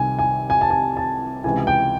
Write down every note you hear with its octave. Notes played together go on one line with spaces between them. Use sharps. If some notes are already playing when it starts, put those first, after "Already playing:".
Already playing: C2 C3 D#3 G#5
G#5
G#5
A5
G#5
A5
C#2 C3 E3 G#5
G5